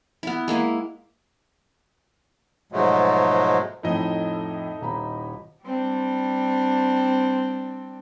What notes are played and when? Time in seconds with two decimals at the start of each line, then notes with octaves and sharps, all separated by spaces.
0.23 B3 E4
0.48 G#3 A#3 E4
2.72 G#2 B2 F3 F#3 G#3 A3
3.83 F2 A2 D#4 E4 A4 D#5
4.81 D#1 A#5 B5
5.64 G3 C4 D4